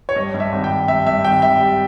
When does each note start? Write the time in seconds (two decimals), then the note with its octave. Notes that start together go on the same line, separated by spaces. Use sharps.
0.09 C#5
0.16 G2 D#5
0.34 G2
0.40 E5
0.52 G#1
0.64 G5
0.70 G#1
0.88 G2 E5
1.06 G2 E5
1.25 G#1 G5
1.42 G#1 E5
1.60 G3